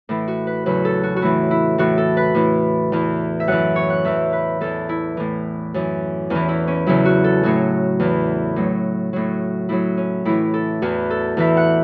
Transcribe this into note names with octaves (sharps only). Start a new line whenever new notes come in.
A2 E3 E4
F#4
B4
E2 C#3 F#3 B4
A4
F#4
F#4
A2 E3 E4
E4
A2 E3 F#4
A4
B4
A2 E3
E2 E3
E5
F#2 E3 F#5
C#5
F#5
E2 E3 E5
B4
E2 E3 A4
E4
A2 E3
F#2 E3
E2 E3 C#4
E4
C#4
E2 C#3 F#3 E4
F#4
A4
A2 F#3 F#4
E2 E3
A2 F#3
A2 F#3
A2 F#3 E4
C#4
A2 E3 E4
A4
E2 E3 F#4
A4
E2 E3 E5
F#5